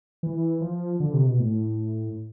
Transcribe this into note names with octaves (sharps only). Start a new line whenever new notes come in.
E3
F3
D3
C3
B2
A2